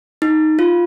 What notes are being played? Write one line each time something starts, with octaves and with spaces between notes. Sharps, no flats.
D#4
F4